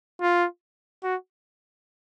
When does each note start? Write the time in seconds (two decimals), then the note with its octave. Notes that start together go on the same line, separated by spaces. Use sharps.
0.21 F4
1.03 F#4